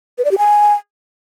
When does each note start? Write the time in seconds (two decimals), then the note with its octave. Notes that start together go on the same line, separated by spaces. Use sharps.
0.18 B4
0.25 D5
0.31 G4
0.38 G#5